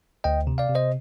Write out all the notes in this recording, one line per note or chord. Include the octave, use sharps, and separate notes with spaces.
D2 D#5 G5
C3
D5 F5
C3
C5 D#5